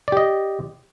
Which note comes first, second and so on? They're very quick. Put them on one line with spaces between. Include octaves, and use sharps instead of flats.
D5 G4 D#5